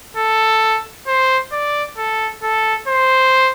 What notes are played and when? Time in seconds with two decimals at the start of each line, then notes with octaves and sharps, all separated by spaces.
0.17 A4
1.07 C5
1.52 D5
1.98 A4
2.43 A4
2.87 C5